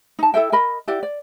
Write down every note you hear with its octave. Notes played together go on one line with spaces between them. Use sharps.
D#4 A5
E4 A4 E5 G5
A#4 D#5 B5
E4 G4 D5 F#5
D5